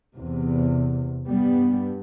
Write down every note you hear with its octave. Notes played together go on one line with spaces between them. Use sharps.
E2 C3
G2 G3 B3